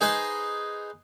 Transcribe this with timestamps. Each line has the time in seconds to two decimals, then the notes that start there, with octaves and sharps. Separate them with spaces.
0.01 D#4 G#4 B4 C5 D#5